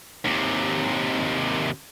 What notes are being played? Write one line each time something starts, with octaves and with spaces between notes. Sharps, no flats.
D#2 C3